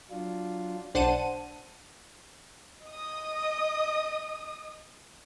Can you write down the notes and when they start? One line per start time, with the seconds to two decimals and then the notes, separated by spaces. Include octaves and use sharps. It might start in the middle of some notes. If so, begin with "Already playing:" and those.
0.11 F#3 D4 F4
0.95 B1 D4 C5 F#5 A5 D#7
2.87 D#5 D#6